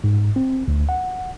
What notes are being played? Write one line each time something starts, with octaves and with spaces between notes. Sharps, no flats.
G#2
C4
D2
F#5